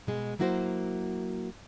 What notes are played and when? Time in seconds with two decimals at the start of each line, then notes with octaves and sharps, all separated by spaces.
0.07 B2 G#3 G#4
0.39 F#3 A#3 E4 F#4 A#4 C5